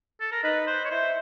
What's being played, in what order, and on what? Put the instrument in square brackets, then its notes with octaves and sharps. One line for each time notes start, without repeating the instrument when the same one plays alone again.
[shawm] A4
A#4
[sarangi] D#4 [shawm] B4
[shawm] C5
C#5
[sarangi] E4 [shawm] C5